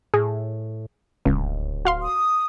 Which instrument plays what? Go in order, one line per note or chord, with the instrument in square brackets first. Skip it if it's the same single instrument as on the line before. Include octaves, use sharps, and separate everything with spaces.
[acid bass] A2 [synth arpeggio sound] G#4
[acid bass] D1 [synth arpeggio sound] C#2
[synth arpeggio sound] F#4 F5 C6
[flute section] D#6